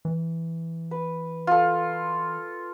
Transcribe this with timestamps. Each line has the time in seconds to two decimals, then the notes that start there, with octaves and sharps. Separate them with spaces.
0.05 E3
0.91 B4
1.47 F4 A4